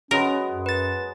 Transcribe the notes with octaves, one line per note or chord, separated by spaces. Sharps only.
F#3 G#3 B3 C#4 A#4
F#2
B4 A6